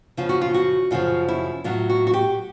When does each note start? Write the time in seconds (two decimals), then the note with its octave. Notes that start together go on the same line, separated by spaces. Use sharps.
0.17 F#2 C#3 F3 F4
0.29 F#4
0.41 F4
0.54 F#4
0.91 F#2 C#3 F3 F4
1.28 E4
1.64 A2 F#3 F4
1.90 F#4
2.07 F#4
2.14 G4